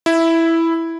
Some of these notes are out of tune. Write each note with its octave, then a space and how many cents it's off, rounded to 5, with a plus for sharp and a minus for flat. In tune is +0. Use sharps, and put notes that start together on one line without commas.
E4 +0